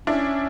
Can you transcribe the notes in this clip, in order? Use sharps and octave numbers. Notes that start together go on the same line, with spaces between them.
C#4 D4 E4